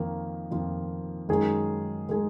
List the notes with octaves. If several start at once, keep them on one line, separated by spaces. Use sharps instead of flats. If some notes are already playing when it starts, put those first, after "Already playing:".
Already playing: F2 D#3 A#3 F4
F2 D#3 A#3 F4
F#2 D#3 G#3 D#4 G#4
D#3 G#3 D#4 G#4